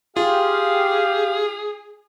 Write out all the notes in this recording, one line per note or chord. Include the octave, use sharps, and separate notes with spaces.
F4 G4 G#4 F5